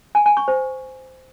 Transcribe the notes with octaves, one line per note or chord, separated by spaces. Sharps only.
G#5
G#5
C#6
C5